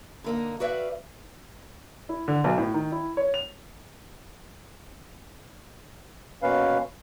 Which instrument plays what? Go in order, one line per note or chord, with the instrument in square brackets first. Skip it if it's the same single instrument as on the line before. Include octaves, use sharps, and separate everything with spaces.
[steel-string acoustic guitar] D3 A#3 D#4
F#4 B4 D5 E5 F5
[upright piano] E4
D3
B1
A2
D#3
E4
C#5
F7
[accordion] B2 A#3 C#4 B4 F5